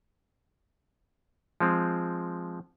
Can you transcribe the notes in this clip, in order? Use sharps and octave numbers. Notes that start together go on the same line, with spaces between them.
F3 G#3 C4